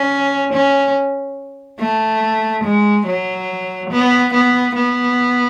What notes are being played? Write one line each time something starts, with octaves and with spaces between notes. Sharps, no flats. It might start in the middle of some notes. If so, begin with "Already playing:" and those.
Already playing: C#4
C#4
A3
G#3
F#3
B3
B3
B3